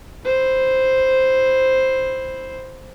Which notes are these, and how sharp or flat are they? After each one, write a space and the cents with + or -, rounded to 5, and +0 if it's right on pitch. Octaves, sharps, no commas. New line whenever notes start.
E4 +0 C5 +0